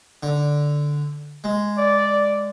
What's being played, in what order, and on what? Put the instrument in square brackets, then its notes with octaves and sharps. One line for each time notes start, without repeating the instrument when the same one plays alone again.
[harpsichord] D3
G#3
[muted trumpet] D5